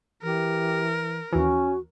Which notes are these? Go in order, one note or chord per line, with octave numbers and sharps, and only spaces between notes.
E3 G4 A#4
D#2 E3 C#4 F#4